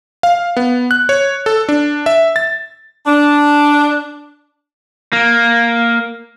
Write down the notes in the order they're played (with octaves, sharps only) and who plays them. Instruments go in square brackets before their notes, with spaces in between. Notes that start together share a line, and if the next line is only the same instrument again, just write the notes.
[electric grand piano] F5
B3
F#6
C#5
A4
D4
E5
A6
[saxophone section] D4
[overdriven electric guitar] A#3